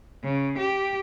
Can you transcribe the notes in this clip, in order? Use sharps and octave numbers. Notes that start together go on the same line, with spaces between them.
C#3
G4